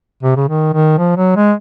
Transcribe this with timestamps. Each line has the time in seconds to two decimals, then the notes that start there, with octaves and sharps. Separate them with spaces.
0.23 C3
0.36 C#3
0.48 D#3
0.74 D#3
0.98 F3
1.17 F#3
1.36 G#3